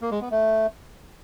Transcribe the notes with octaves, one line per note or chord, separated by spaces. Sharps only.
A#3
G#3
B3
A3